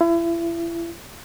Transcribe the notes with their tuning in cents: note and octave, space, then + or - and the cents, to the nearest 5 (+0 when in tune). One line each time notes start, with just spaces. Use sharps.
E4 +35